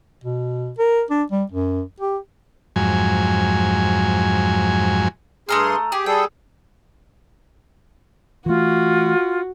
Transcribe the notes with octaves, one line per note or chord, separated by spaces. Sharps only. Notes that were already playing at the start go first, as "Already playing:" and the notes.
B2
A#4
D4
G3
F#2
G4
F2 G#2 F#3 G#5
G2 A3 G#4 A#5 C6 F6
G4 G#4
G3 G#4 A4 G5
E3 A3 F4 F#4